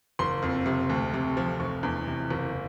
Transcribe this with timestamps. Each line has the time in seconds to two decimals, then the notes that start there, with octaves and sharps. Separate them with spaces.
0.19 F#1 C6
0.42 F2
0.66 C3
0.89 D2
1.13 C3
1.37 F3
1.60 F1 C#6
1.83 E2
2.07 C3
2.31 F#1